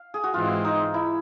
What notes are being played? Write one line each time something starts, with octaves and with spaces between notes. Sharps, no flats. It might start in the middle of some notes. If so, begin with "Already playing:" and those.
Already playing: F5
G#4
F#4
G#2 E3 G#3 C4 F4
D#4
E4